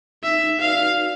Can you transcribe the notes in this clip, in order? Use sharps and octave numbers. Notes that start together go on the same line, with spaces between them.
D#4 E5
F#4 B4 D5 F5
D#4